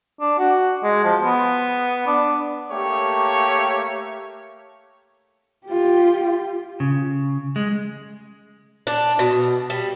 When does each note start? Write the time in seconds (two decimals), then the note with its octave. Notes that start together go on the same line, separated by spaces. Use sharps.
0.20 D4
0.38 F#4
0.83 G#3
1.04 F3
1.22 B3
2.07 D4
2.71 A3 A#3 G4 C#5
5.67 F4 G4
6.80 C#3
7.56 G#3
8.87 D4
9.19 B2
9.70 G3